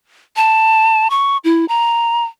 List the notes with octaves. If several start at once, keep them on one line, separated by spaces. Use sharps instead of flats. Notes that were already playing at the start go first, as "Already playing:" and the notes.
A5
C#6
E4
A#5